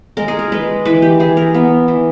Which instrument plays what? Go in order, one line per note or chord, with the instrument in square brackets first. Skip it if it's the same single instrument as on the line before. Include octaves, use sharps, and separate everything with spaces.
[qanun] G#3 A#4
G#4
A#4
G#3 B4
E3 B4
G4
E3 G#4
A#4
B3
E3